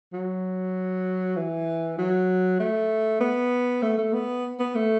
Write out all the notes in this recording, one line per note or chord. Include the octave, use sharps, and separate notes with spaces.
F#3
E3
F#3
A3
B3
A3
A3
B3
B3
A3